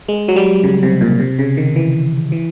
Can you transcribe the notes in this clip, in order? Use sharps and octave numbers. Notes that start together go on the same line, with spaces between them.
G#3
F#3
G3
C#3
C3
A#2
C3
C#3
D#3
E3
E3